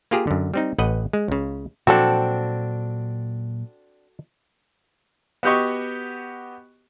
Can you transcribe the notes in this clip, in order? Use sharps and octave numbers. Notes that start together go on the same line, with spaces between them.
A#3 F4 G4 G#4 A#4
F#2 D3
G3 C4 D#4
A1 B4 D#5 F#5
G#3
C#2 C#3
A#2 F3 F#3 C4 D4 F#4 A4
B3 F#4 G4 D#5 C#6